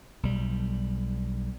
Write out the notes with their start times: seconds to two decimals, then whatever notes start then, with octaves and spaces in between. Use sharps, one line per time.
0.23 B1 G3